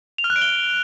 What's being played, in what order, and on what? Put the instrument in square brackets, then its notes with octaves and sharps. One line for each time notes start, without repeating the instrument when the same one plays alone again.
[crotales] F7
F6
F#6
D7
G7